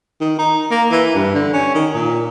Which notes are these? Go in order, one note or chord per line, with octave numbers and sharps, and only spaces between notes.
D#3
D#4
A#3
E3
G2
D3
C#4
D#3
A#2